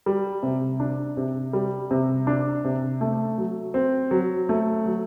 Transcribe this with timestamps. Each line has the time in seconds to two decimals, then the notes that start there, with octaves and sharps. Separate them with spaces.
0.06 G3
0.43 C3
0.80 D4
1.17 C3
1.53 G3
1.91 C3
2.27 D4
2.65 C3
3.01 A3
3.38 F#3
3.74 C4
4.11 F#3
4.49 A3
4.86 F#3